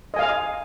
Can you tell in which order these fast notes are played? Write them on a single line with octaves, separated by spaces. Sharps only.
D#5 G#5 F5